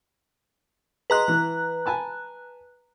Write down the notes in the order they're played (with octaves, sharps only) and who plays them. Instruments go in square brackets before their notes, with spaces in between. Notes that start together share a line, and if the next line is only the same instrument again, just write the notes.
[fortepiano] G#4 D#5 C6 [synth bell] B4 A#5 F#6
[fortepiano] E3
G#5 A5 B5